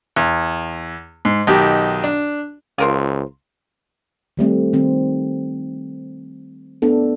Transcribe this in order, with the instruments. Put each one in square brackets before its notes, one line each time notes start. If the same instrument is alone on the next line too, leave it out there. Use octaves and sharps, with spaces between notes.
[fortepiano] E2
G#2
B1 D#3 G4
D4
[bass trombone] C#2 [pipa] F4 A#4 C5
[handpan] D#3 G3 A3 C4
D#3 C4
A3 B3 D4 A4